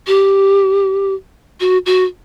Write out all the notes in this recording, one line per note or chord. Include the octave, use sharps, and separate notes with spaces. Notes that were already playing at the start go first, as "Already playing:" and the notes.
G4
F#4
F#4